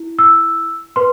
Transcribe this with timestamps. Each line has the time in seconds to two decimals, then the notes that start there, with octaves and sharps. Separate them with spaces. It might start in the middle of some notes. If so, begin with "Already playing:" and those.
Already playing: E4
0.19 E6
0.96 B4 C6